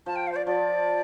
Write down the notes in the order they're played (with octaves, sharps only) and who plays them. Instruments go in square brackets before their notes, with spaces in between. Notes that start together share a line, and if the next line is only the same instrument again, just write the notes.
[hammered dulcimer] F3 [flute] A5
[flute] G5
F5
C5
D5
[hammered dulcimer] F3 [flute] D5